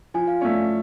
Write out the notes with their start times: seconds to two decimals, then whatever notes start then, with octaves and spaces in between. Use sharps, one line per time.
0.14 F3 G#5
0.28 F5
0.41 A3 C#4 D5